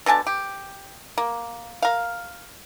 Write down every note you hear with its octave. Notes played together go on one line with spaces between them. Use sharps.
B2 D3 G#5 A5
G4
A#3
A#4 F5